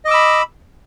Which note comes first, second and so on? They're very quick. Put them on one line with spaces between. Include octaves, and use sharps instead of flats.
D#5 D6 E6 B5